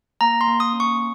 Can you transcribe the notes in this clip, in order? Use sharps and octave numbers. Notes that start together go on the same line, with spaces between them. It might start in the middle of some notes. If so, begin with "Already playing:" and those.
A#3 A#5
C6
A#3
D#6
C#4
C#6